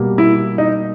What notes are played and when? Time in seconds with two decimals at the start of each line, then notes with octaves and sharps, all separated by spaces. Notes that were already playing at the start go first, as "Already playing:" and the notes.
Already playing: B2 G3 A#3
0.18 E4
0.58 D#4